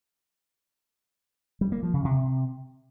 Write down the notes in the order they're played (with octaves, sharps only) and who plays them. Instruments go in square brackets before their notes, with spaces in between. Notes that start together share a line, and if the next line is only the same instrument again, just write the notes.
[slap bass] G3
A#3
F3
C#3
C3